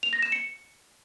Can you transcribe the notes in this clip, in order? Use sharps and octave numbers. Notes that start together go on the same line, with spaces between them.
F7
A#6
E7
C#7